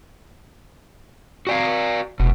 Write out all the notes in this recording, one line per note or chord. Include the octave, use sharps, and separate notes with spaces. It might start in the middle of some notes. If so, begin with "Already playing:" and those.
F#4 D5 F5
F1 B2